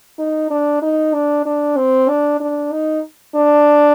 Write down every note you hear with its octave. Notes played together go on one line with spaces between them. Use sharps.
D#4
D4
D#4
D4
D4
C4
D4
D4
D#4
D4